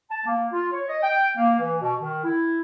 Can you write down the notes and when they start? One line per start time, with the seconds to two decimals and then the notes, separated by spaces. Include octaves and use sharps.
0.11 A5
0.26 A#3
0.53 F4
0.73 C#5
0.88 D#5
1.03 G5
1.37 A#3
1.58 E3
1.81 B2
2.01 D#3
2.24 E4